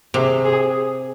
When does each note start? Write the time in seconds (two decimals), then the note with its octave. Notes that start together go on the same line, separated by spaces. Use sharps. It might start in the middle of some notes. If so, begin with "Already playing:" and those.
0.14 C3 G#4
0.45 G#4